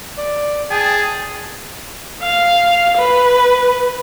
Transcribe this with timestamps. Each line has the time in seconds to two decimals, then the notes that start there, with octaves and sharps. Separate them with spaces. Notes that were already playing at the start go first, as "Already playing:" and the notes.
0.18 D5
0.70 G#4 G5 A5
2.22 F5
2.97 B4